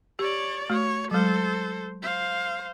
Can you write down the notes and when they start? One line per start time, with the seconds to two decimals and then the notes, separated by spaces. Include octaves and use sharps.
0.19 G4 C#5 D5
0.70 A3 F#4 C#5
1.11 F#3 G#3 A4 C5
2.03 C5 F5